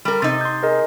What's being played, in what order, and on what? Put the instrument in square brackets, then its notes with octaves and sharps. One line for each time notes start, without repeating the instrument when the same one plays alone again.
[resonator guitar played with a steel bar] G3 A#4
[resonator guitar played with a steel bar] C3 D#4 [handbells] A6
[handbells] C6 G6
G#4 A#4 D#5